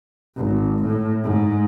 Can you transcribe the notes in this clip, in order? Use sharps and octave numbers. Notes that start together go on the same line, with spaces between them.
G#1
A2
G#2